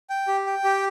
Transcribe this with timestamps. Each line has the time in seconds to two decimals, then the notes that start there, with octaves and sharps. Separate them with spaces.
0.10 G5
0.28 G4
0.46 G5
0.64 G4